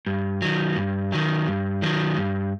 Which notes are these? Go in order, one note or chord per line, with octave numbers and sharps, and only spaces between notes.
G2
D#3 F#3
G2
D#3 F#3
G2
D#3 F#3
G2